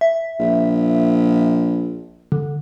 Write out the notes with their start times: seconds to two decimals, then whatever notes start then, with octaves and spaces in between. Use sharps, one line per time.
0.01 E5
0.40 A#1
2.32 D3